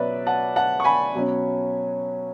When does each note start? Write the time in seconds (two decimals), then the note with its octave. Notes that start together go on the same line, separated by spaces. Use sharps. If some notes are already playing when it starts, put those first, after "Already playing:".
Already playing: B2 F#3 C#4 B4 D5 E5
0.26 F#5 A5
0.56 F#5 A5
0.80 C#6
0.84 G#5 B5
1.14 B2 F#3 C#4